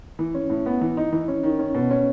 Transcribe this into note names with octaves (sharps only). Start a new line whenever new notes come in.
E3
C#4
A2
B3
E3
D#4
E3
C#4
D#3
C#4
B2
C#4